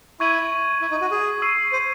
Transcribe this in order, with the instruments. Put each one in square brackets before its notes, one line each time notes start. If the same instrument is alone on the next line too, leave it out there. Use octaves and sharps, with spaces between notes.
[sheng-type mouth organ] E4 [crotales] C#6 G#6 D#7 F#7
[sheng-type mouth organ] E4
D#4
F#4
G#4
[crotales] C#6 E6 C7 D#7
[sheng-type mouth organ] C5